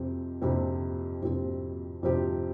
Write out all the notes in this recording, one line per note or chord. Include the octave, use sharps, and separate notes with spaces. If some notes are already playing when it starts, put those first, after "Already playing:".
Already playing: F2 C3 F3 C4 G4
F2 C3 F3 C4 G4
F2 C3 F3 C4 G4
F2 C3 F3 C4 G4